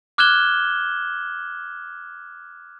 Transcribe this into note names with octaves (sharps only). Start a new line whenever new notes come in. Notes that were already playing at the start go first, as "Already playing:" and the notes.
D6 F6 F#6 G#6 E7 G7